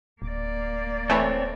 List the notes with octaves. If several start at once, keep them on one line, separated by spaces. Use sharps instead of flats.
D1 A#3 D5
E3 A3 C4 C#5